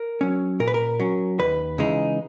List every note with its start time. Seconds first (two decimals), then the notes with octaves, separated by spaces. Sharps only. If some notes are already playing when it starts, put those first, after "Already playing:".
Already playing: A#4
0.21 F#3 C#4
0.60 A#2 A#4
0.68 B4
0.74 A#4
1.00 F#3 C#4
1.40 D#2 B4
1.78 C#3 E3 G#3 D#4